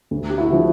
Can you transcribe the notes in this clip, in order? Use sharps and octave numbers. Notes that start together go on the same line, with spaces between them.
D2
G4
E4 F#4
D3 F3